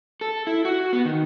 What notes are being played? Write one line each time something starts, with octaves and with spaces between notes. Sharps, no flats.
A4
E4
F#4
B3
D#3